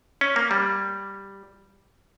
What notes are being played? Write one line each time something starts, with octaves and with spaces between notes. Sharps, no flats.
C#4
A#3
G3